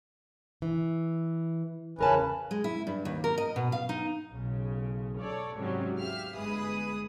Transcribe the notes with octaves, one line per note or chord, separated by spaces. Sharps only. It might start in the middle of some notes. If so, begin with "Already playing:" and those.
E3
E2 C#3 C#4 A#4 B4 A5
G#3
E4
G2
D#2
A#4
D#5
B2
F5
D#4
B1 C#3
A4 C#5 D5
G#2 C3 F#3 G3 C#4
G4 E5 F5 F6
G1 G#3 G#4 B4 D#6